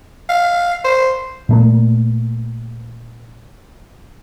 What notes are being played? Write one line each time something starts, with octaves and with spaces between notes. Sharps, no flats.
F5
C5
A#2 A3 A#3